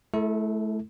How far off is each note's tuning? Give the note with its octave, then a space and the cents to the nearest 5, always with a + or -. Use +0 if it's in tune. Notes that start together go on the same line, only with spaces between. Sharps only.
A3 -30 E4 +0 A4 +30